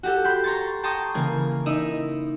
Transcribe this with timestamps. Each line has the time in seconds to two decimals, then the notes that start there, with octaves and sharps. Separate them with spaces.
0.03 F#4 G4 A4
0.25 G5 B5 C6 G6
0.44 A#5 C6 C#6 A6
0.83 G5 A5 A#5 C6 C#6 D#6
1.14 C#3 E3 A#3 G#6
1.66 D#4 E4 D#5 E5